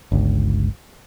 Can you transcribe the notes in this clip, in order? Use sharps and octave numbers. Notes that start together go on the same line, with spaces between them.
G1 C#2